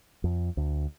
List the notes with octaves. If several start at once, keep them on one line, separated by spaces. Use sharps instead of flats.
F2
D2